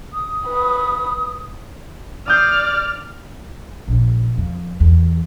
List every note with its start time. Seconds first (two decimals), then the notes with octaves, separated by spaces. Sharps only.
0.13 D#6
0.48 B4
2.28 D5 D#6 F6 G6 C7
3.88 A#1
4.38 F2
4.80 E2